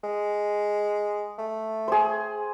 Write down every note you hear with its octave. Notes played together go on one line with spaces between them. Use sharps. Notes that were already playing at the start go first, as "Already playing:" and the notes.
G#3
A3
G#4 C5